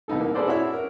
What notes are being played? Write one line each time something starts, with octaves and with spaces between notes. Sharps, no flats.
C2 B3 D#4 A4
A#3
G#4 A4 B4 C5 D5
D4 E4 F#4 C#5 E5 C#6
A#4